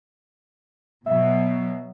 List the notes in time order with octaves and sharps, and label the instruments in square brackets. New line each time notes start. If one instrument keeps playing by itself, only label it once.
[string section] B2 F#3 [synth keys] E5